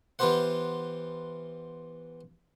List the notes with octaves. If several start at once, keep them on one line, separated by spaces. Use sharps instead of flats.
E3 B3 F4 G4 C5 F#5